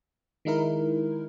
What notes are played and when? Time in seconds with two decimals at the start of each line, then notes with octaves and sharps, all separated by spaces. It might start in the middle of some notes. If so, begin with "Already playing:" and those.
0.45 D#3 G#3 D#4 E4 A#4